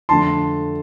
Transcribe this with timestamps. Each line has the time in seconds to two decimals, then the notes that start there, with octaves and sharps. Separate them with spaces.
0.09 F2 D3 A3 A5 C6